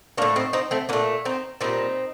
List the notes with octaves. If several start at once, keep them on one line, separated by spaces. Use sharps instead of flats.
A2 A3 A#3 D4
C4 D#4
C4 D#4
A3 C4
A#2 A3 A#3 D4
C4 D#4
A#2 G3 C4 D#4